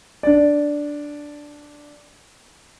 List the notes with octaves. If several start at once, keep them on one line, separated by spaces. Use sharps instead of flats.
D4 D5